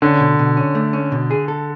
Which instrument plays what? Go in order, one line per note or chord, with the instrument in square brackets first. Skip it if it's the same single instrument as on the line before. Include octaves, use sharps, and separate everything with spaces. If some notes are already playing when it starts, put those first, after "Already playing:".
[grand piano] D3 [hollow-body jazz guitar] C#4
[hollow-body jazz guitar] B2
B2
C#4
A3
C#4
B2
G#4
A4